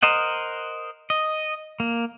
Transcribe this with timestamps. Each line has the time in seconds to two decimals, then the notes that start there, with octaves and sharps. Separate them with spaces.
0.03 A#4 C5 D#5 F#5
1.10 D#5
1.80 A#3